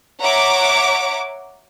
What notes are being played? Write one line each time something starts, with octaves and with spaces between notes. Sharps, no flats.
C#5 E5 F#5 A#5 D6